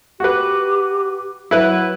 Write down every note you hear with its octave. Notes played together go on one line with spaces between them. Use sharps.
F#4 G4 B4
F#3 E4 B4